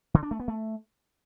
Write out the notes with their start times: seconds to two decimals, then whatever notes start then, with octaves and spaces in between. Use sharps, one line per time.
0.14 D3
0.23 D4
0.31 A3
0.40 B3
0.48 A3